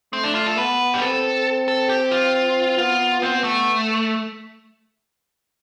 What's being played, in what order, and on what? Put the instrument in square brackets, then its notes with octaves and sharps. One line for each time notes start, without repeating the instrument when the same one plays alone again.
[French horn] A3 [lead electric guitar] C4
[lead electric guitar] D4
F4
A4
[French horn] B3 [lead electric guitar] B4
[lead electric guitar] G4
[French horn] C4 [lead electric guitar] A4
[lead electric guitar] A4
G4
F4
[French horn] B3 [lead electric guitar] F4
[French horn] B3 [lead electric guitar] C4
[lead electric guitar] A3